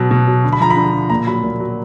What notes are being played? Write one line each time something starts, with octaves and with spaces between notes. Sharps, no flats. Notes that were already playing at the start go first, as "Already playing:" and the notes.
Already playing: B2 F#3
B2
F#3
D3
B5
F3 A#5
B5
D3
F3
A#2 A#5
F#3 B5
A#2
F#3